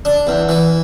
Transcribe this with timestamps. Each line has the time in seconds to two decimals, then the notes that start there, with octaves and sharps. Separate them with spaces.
0.05 D4
0.27 E2
0.49 E3